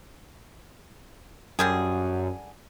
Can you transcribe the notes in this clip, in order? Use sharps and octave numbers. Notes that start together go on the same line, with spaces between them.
F#2 D3 G3 G#4